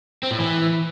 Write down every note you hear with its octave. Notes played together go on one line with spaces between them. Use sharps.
C4
A2
E3